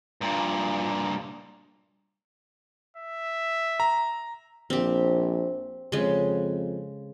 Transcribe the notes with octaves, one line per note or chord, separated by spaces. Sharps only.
G2 A#2
E5
A#5
A#1 C4 G4
F2 C#3 G#3